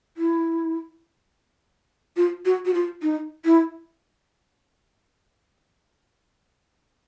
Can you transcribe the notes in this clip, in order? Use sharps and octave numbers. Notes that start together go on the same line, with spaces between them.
E4
F4
F#4
F#4
F4
D#4
E4